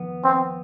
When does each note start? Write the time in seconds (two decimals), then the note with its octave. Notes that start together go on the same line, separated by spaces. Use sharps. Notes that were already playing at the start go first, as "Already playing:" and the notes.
Already playing: F2 D#3 B3
0.24 C4